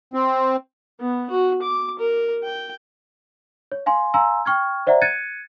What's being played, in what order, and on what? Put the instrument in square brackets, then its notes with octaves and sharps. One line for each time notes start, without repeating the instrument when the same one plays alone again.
[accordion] C4
[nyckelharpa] B3
F#4
D6
A#4
G5
[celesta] C#5
F5 G#5 C6
F5 G#5 A#5 C6 E6
G5 C#6 F6 G#6
C5 D5 E5 F#5 A#5
F#6 G#6 A6 C#7 D#7